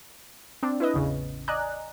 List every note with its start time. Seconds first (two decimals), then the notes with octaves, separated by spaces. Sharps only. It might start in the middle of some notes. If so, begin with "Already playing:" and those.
0.63 C4 D4
0.80 E4 B4 D#5
0.94 A1 E2 C#3
1.48 D5 D#5 G#5 A#5 F#6